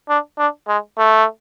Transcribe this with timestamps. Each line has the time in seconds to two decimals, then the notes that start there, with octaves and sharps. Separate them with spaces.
0.09 D4
0.38 D4
0.68 G#3
0.98 A3